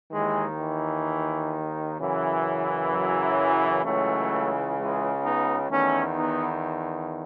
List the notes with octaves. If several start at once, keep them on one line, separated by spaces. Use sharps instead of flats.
D#2 D#3 E3 G#3
E3
F#2 C#3 E3
F#3
C#2 C#3 E3 F#3 A3
E3 G#3
B3 D#4
E2 D#3 A3 C#4
B3 D#4